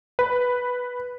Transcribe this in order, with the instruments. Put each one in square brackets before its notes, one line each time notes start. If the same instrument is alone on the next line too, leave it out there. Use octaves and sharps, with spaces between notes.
[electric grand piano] B4